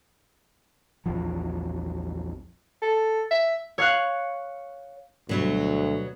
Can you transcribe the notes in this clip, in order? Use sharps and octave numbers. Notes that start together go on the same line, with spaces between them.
A#1 E2 E3 F3
A4
E5
C#5 F5 F#6
D2 B2 F#3 G3